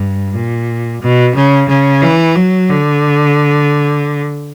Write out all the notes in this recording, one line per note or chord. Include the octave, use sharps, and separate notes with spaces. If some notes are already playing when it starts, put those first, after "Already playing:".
Already playing: G2
A#2
B2
C#3
C#3
E3
F#3
D3